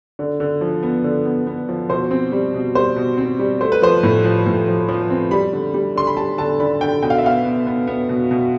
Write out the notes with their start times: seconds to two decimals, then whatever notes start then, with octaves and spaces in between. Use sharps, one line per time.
0.19 D3
0.40 D3
0.61 F3
0.83 B3
1.04 D3
1.26 B3
1.47 B3
1.69 F3
1.89 B2 C5
2.11 C4
2.32 G3
2.54 B2
2.75 G3 C5
2.96 B2
3.18 C4
3.39 G3
3.60 A3 C5
3.72 B4
3.82 F3 C5
4.03 A2
4.24 F3
4.46 A2
4.68 F3
4.89 F3
5.10 C4
5.31 G3 B5
5.53 D3
5.74 G3
5.96 D3 C6
6.07 B5
6.17 G3 A5
6.38 D3 A5
6.60 D3 B5
6.81 D3 G5
7.03 B2 G5
7.10 F5
7.18 E5
7.24 B3 F5
7.45 B3
7.67 B3
7.87 B3
8.09 B2
8.31 B2